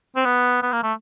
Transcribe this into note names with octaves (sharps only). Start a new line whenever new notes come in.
C4
B3
B3
A#3
A3